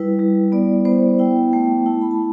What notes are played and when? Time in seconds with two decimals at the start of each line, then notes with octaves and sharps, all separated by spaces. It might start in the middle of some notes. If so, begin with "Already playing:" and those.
Already playing: G3 E4 B4
0.19 G3
0.52 B3 D5
0.85 B3 C5
1.19 E4 G5
1.52 A3 G5
1.86 E4 A5
2.01 B5
2.11 A5